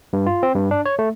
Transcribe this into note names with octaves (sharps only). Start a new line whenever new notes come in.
G2
F4
C4
G2
D4
C#5
A3